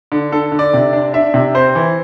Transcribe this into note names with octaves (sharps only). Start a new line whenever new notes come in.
D3
D3 A4
D3
D5
C3
D4
D4 E5
C3
C4 C5
E3